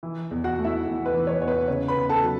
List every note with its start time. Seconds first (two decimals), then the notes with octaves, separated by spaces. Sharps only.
0.03 E3
0.31 E2
0.44 F#4 F#5
0.58 A3
0.64 E4 E5
0.86 E2
1.06 B4
1.14 E3
1.27 C#5
1.41 E2 C#5
1.48 B4
1.68 C#3 C#5
1.88 B4 B5
1.96 B3
2.09 A4 A5
2.23 F#3